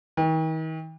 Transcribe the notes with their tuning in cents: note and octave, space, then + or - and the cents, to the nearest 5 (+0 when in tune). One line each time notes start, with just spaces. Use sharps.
D#3 +40